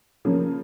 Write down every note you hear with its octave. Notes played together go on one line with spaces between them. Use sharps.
C#3 F3 A#3 C#4